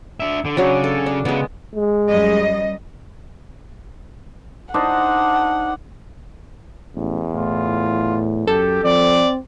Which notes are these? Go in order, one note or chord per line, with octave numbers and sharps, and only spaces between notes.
D4 E5
D3
C#3 F#3 D4
A4
D4
C#3 G#3 B3
G#3
F#2 G3 D#5
D4 D#4 C5 F#5
A1 E2
A2 F4
F#2 G4 A4
F3 C4 D5